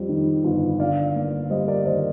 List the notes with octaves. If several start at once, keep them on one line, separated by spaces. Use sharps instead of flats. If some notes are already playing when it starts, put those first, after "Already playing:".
Already playing: F2 G3
D#3
G1
D3 D5 F5
A#3
G3 C5 D#5
A#4 D5
D#2 C5 D#5